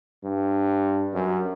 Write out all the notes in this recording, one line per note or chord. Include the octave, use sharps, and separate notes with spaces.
G2
F#2